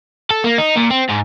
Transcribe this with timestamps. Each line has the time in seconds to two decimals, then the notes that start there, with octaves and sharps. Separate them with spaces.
0.31 A4
0.44 A#3
0.58 D#4
0.76 A#2
0.90 C4
1.09 G#2